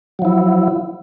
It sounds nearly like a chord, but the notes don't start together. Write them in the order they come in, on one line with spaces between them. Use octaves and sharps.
F#3 F3 E4